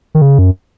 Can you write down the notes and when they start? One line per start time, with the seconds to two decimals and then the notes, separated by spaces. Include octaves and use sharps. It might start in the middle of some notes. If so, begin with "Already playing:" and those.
0.15 D#3
0.22 C#3
0.39 F#2